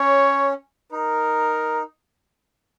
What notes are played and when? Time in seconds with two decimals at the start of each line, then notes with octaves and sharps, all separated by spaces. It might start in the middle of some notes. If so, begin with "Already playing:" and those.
Already playing: C#4 C#5
0.92 D#4 A#4